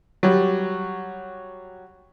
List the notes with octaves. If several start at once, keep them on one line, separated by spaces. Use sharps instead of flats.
F#3 G3